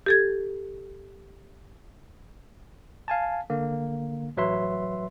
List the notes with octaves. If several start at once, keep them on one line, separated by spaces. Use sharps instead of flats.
G4 A4 G#6
F5 G#5 A5
D3 A#3
A1 F#3 B4 E5 C6